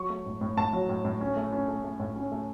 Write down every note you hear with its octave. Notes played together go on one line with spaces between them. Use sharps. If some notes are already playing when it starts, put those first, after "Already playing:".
Already playing: F#3 C#6
A3
A2
A2
A2 A5
F#3
A2
A2
C#4
A3
C#4
A3
A3
A2
C#4
A3